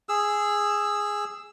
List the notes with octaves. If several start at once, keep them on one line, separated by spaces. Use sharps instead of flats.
G#4 E6